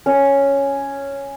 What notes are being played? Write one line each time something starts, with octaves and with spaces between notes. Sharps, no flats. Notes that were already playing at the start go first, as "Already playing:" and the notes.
C#4